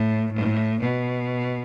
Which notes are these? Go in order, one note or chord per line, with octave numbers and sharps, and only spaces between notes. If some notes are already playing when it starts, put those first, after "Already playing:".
Already playing: A2
A2
B2